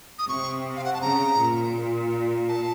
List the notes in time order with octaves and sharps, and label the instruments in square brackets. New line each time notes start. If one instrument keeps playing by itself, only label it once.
[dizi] D#6
[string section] C3 [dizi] C#6
[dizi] F5
F#5
A5
[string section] C#3 [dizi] A#5
[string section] A#2
[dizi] A5